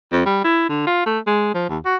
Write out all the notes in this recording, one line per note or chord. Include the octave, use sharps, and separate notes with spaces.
F2
G3
E4
D3
F4
A3
G#3
F3
D#2
F#4